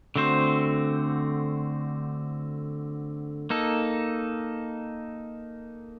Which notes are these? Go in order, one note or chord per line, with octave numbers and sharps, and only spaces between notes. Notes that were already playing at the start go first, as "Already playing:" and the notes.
D3 A3 C4 F#4 C5
A#3 D#4 A4